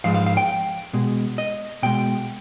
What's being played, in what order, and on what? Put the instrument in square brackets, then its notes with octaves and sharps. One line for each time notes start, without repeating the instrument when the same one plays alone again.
[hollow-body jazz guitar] G#2 F3 G#3 F5
F5
F5
G5
B2 G#3
D#5
B2 G#3 G5